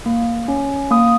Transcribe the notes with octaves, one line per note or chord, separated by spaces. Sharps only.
A#3
C#4
A#3 D#6